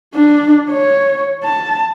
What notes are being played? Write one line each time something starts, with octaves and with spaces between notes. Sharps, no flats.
D4
C#5
A5